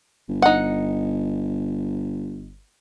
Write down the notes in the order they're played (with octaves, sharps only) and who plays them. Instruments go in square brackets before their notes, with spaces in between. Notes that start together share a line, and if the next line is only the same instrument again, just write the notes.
[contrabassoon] G1
[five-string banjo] D#4 F#5